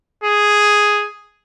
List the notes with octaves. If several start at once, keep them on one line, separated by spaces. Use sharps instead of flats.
G#4